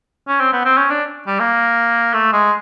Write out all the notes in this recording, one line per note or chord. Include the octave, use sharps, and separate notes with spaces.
C#4
C4
B3
C4
C#4
D4
G3
A#3
A3
G#3